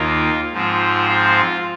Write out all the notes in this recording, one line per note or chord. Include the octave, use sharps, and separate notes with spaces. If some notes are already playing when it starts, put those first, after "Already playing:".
Already playing: D#2 D#3 A#3 F4
G#2 F3 C4
F4